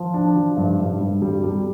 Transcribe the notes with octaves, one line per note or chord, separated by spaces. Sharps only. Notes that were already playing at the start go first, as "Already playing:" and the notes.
Already playing: F3
D4
F3
G2
G2
G2
G3
G3